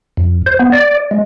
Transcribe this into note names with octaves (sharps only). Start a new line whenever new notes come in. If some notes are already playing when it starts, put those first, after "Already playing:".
F2
C5
B3
D5
G#3